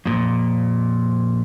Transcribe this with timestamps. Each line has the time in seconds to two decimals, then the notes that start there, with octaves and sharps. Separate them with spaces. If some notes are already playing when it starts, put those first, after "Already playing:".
0.05 F2 A#2